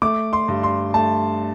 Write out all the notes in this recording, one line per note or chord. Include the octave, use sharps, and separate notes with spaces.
A3 D6
C6
G2
C6
A3 A5